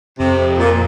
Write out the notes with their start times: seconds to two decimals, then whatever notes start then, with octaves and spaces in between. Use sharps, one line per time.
0.20 F2 C3
0.59 A#2